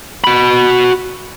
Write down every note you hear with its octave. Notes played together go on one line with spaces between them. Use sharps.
F#4 B5